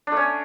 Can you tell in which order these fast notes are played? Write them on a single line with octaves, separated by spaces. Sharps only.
D4 A3 C#4